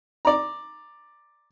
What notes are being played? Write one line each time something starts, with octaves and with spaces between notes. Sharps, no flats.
D5 A#5